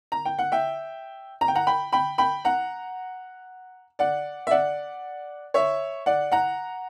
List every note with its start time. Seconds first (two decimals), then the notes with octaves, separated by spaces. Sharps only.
0.12 A#5
0.25 G5
0.39 F#5
0.52 E5 G5
1.41 A#5
1.48 G5
1.55 F#5 A#5
1.67 G5 B5
1.93 G5 B5
2.18 G5 B5
2.45 F#5 A#5
3.99 D5 F#5
4.47 E5
4.51 D5 F#5
5.54 C#5 E5
6.06 D5 F#5
6.32 F#5 A#5